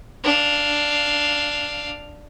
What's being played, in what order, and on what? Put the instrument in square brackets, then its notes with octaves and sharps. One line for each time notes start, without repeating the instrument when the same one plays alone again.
[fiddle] D4 F5